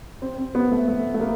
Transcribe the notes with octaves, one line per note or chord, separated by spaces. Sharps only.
C4
C4
B3
A3
A3
A3
A#3